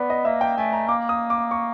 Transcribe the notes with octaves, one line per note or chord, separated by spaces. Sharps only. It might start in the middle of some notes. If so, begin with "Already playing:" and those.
Already playing: B3 B4 D5
D#5
A#3 E5
G5
A3 G#5
A#5
A#3 D6
D#6
D6
C#6